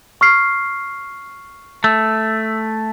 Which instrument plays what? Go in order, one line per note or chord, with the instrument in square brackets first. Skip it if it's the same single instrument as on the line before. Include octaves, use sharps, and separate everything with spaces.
[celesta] C#6 F6 C7
[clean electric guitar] A3 [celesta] E6